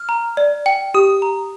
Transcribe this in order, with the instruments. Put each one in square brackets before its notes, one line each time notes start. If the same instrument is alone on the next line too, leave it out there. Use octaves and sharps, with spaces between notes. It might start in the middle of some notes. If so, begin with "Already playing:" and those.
Already playing: [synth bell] F6
[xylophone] A#5
D5
G5
[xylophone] G4 [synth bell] D#6
[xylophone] A#5